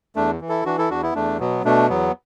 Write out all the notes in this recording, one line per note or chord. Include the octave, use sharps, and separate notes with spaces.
E2 A3 D4
E3
E4 A4
E3 D4 F#4
E4 A4
E2 D4 F#4
B3 E4
E2 A3 D4
B2 F#3 B3
B2 A3 D4
E2 F#3 B3